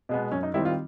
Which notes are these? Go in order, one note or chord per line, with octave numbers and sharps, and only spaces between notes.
B2 G#3 B3
F#2 C#4
D#4
D#3 G3 C4 E4
F4